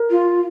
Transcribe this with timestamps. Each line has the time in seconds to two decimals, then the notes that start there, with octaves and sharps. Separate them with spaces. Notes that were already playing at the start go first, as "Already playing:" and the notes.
Already playing: A#4
0.10 F4